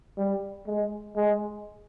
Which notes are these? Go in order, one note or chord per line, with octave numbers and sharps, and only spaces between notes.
G3
G#3
G#3